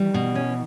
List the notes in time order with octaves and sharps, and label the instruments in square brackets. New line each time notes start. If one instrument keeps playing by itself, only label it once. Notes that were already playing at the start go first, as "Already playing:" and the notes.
Already playing: [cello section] E3 [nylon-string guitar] G3
[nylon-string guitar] B2
C#4